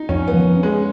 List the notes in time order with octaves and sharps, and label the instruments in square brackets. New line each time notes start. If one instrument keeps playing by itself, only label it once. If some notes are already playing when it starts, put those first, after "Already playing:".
Already playing: [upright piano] D#4
[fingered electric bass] F2 [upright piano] C#4
[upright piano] B3
[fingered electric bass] F3
C#4
[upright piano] G#3